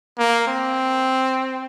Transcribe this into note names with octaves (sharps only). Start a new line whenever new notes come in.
A#3
C4